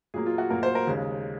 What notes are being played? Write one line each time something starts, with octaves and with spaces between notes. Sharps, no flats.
A#2 F#3 A#3 G#4
F4
F#4
A#2 F#3 A#3 A#4
C5
A#4
D#2 C#3 G#3